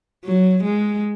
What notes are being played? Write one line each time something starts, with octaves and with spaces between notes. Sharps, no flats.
F#3
G#3